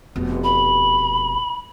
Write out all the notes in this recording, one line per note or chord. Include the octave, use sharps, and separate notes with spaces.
F1 B2
B5